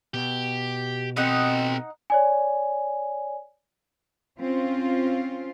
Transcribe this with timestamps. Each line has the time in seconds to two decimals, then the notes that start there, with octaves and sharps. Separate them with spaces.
0.14 B2 G4
1.17 C4 D#4 A4 B4 D#5 F#5
2.10 C#5 D5 G#5
4.39 C4 C#4 F4